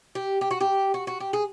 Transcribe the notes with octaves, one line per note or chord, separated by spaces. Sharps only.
G4
G4
F#4
G4
F#4
F#4
G4
G#4